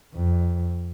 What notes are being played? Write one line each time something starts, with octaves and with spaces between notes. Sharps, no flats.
F2